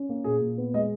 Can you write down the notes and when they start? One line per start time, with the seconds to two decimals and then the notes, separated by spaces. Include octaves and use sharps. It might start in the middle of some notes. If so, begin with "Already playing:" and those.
Already playing: C#4
0.09 A#3
0.24 A#2 G#4
0.41 A#2
0.58 B3
0.74 G#3 D#5